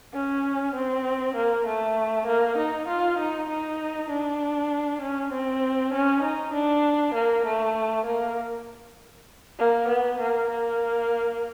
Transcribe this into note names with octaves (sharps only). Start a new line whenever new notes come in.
C#4
C4
A#3
A3
A#3
D#4
F4
D#4
D#4
D4
C#4
C4
C#4
D#4
D4
A#3
A3
A#3
A#3
B3
A#3
A#3